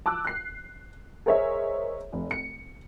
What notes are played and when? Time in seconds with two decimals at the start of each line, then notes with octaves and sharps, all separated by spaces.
0.06 A5 D6 E6 F#6
0.24 F#6 C7
1.26 G#4 A#4 C5 C#5 D#5 E5
2.13 F1
2.31 C#7